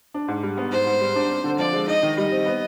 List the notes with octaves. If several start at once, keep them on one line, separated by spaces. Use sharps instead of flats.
D4
G#2
G3
B3
G#2 C5
G#2
G3
D4
C4
D3
F3 D5
G#3
D#4 D#5
D#3
G3 D#5
C4
B3